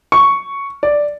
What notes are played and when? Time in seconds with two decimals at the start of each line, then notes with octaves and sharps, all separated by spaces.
0.12 C#6
0.83 D5